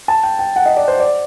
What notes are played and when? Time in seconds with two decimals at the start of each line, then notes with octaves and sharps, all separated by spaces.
0.08 A5
0.23 G5
0.39 G5
0.56 F#5
0.66 D#5
0.77 D5
0.88 C5
1.00 D5